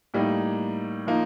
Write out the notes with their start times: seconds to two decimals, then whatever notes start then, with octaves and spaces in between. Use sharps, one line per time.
0.14 A2 G3 A#3 D#4
1.07 F3 A#3 D#4